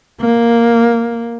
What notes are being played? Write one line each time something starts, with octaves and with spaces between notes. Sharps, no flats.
A#3